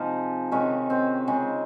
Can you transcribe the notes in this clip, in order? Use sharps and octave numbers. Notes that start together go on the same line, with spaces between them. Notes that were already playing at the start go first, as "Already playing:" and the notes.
Already playing: C3 F3 G#3 D#4 F4 G#4 C5
C3 D#3 G#3 C#4
C4
C#3 G#3